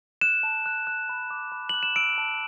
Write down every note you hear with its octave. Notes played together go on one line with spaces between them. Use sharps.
F#6 E7
A5
F#6
F#6
B5
D6
B5
F#6 F#7
E7
E6 D7
A5